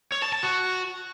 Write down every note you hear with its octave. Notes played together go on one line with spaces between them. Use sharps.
C#5
A5
A5
F#4